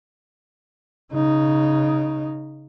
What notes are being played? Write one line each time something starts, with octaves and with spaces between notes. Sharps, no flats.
C#3 D#4